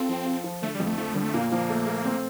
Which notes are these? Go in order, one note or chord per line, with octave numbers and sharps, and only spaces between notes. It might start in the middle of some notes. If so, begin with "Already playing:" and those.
Already playing: C4 F4 A4
F3
F4
F3
D3 A3
G3
F2
A3
F3 A3
D3 G3
A3
A#2 A#3
F3 A#3
A3
A3
C4